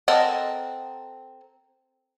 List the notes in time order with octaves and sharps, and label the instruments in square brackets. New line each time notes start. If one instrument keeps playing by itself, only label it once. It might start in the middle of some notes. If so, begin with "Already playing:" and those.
[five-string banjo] C4 A4 A#4 D#5 F#5